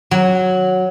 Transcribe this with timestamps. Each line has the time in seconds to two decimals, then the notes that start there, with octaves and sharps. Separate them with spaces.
0.11 F#3